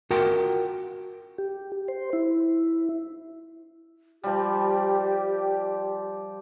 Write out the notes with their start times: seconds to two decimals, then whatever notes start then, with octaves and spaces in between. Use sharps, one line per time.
0.10 F4 F#4 A#4 F#5 G5
1.38 G4
1.88 C5
2.13 E4
4.24 F3 G3 G4